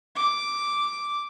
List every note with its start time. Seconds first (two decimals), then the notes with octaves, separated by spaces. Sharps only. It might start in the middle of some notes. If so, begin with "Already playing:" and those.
0.15 D6